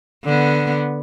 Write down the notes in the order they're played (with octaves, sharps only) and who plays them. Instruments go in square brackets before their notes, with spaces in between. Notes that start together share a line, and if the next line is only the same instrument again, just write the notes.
[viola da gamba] D3 B3